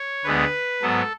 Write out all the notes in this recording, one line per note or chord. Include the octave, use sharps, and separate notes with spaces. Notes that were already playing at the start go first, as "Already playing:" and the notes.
Already playing: C#5
D2 D3 G#3 B3 B4
G#2 F#3 B3 A4